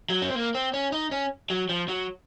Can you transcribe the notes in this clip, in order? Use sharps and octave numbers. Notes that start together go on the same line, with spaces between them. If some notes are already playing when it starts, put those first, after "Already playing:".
F#3
C#4
C4
A#3
C4
C#4
D#4
C#4
F#3
F3
F#3